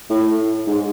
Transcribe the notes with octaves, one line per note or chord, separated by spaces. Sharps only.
A2
G#2